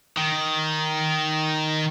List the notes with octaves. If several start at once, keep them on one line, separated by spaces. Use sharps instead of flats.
D#3